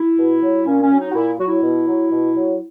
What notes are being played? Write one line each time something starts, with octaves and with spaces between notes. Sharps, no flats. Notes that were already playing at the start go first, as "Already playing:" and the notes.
Already playing: E4
B2
F#3
A#2 C#4
C#4
F#3
D#4
F#4
A#2 E4
F#3 F#4
E4
B2
F#3
B2
F#3